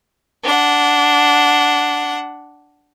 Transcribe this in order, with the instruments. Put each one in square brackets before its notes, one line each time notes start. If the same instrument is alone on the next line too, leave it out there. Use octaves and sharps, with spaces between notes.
[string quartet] D4 F#5